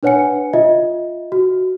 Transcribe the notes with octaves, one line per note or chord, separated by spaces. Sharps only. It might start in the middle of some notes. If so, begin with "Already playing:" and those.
D4 B4 C#5 F#5 G#5 C#7
F4 D#5 E5
F#4